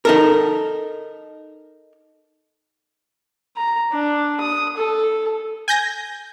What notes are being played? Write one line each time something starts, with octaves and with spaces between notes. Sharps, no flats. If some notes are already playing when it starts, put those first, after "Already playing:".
D#4 A4 A#4
A#5
D4
D#6
A4
G#5 G6 A#6